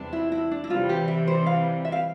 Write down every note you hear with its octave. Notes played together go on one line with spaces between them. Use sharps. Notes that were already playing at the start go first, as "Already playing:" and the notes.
Already playing: E2 C3 E3 G3 D4
E4
E4
D4
E4
C3 E3 G3 F4
G4
E5
C5
F5
E5
F5